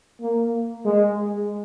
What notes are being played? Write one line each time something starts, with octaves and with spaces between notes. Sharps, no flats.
A#3
G#3